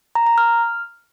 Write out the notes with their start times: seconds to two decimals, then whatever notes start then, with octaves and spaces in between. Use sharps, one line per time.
0.15 A#5
0.27 A#5
0.38 F6